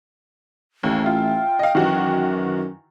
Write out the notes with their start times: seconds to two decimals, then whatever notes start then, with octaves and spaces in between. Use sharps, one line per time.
0.83 A1 D#2
1.04 F4 E5 G5
1.59 D#5 F5
1.75 F#2 D#3 E3 F#4